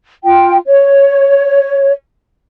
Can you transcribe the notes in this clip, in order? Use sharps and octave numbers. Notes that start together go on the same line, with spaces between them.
F4 G5
C#5